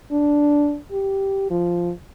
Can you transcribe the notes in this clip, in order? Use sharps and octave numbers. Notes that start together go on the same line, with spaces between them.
D4
G4
F3